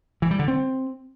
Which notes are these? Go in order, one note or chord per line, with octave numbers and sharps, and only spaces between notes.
E3
G3
D3
C4